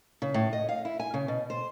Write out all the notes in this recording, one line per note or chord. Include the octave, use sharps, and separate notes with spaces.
C#3
A2
D#5
F5
E4
G#5
C#3
B2
C5